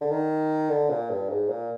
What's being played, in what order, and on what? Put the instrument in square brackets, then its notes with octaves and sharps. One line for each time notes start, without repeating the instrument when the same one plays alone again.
[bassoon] D3
D#3
D3
A#2
G2
G#2
A#2